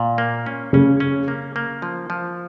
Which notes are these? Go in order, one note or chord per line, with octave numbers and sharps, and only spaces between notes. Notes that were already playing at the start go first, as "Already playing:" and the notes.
Already playing: A#2
A#3
C#4
C#3 C#4
C#4
A#3
A#3
F3
F3